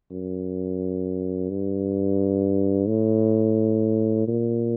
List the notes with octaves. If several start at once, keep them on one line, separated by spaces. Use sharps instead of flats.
F#2
G2
A2
A#2